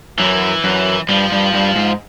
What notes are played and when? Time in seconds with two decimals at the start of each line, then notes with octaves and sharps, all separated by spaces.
0.19 F#2 E3
0.64 F#2
1.09 G2 F3
1.32 G2
1.54 G2
1.76 G#2